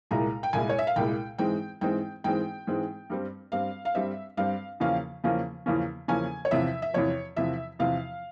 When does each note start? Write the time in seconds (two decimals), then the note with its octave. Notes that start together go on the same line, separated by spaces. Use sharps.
0.11 C2 A#2 G#3 E4 A#5
0.43 G5
0.53 C2 A#2 G#3 E4 G#5
0.69 C#5
0.78 E5
0.87 F5
0.96 C2 A#2 G#3 E4 G5
1.38 G#2 E3 G#3 C4 G5
1.81 G#2 E3 G#3 C4 G5
2.24 G#2 E3 G#3 C4 G5
2.67 G#2 E3 G#3 C4
3.10 G2 G3 C4
3.52 G2 G3 C4 F5
3.85 F5
3.95 G2 G3 C4 E5
4.37 G2 G3 C4 F5
4.80 E2 C#3 F3 A#3 C#4 F5
5.24 E2 C#3 F3 A#3 C#4
5.66 E2 C#3 F3 A#3 C#4
6.08 E2 C#3 F3 A#3 C#4 G#5
6.45 C#5
6.51 E2 C3 F3 E5
6.82 E5
6.94 E2 C3 F3 C#5
7.36 E2 C3 F3 E5
7.79 E2 C3 F3 F5